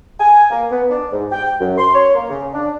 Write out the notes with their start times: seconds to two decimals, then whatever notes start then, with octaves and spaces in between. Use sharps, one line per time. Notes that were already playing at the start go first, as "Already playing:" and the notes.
0.20 G#5
0.51 A#3
0.71 B3
0.90 D4
1.12 G#2
1.32 G5
1.60 F#2
1.78 C6
1.94 C#5
2.15 A#3
2.29 C#3
2.54 D4